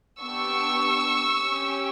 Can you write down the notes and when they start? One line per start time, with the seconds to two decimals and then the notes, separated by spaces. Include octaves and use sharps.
0.21 B3 D4 G4 C#6 E6
1.41 C#4 G4